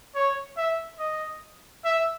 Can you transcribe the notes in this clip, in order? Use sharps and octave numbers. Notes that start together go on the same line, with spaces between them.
C#5
E5
D#5
E5